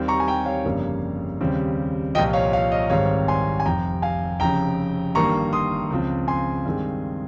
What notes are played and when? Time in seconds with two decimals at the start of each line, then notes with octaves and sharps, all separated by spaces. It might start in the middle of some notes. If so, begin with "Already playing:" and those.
Already playing: D#2 D#3 G3 C4
0.08 A#5 C#6
0.20 G#5
0.28 G5 A#5
0.46 C#5 F5
0.65 G1 F2 C#3 G3 A#3
1.41 D#2 C#3 G3 C4
2.15 C2 A#2 F3 D#5 G5
2.33 C#5 F5
2.53 C#5 F5
2.72 D#5
2.90 G#1 G#2 D#3 G3 C4 C#5 F5
3.28 G#5 C6
3.60 G#5
3.66 F1 F2 C3 G5 A#5
4.02 F5 G#5
4.40 F1 F2 C#3 G5 A#5
5.15 G1 G2 D#3 A#3 A#5 C#6
5.53 C6 D#6
5.91 C#2 C#3 F3 C4
6.28 G#5 C6
6.65 G2 D#3 G#3 C4